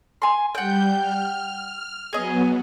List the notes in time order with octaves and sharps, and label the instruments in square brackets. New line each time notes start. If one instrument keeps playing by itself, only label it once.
[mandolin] G#5 C6
[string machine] G3 G6 [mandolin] F#5 G5
[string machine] F6
[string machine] F#3 B3 [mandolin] G#4 D#5